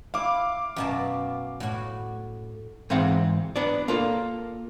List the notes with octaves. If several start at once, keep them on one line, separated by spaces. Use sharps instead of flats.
E4 F5 D6
F#2 B2 A5
A2 F#4
G#2 E3 C4 F5 F#5
B3 D4 D5
A#3 F4 A4